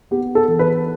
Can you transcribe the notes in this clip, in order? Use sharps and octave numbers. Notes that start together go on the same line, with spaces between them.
B3 G4
A4
E3
B4